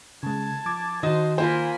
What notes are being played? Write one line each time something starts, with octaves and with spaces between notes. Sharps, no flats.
C#3 G#3 A5 G#6
F3 D6 A6
D#3 F#4 C5 D#5 A5
A#3 F4 A#4 C5 G#5 B5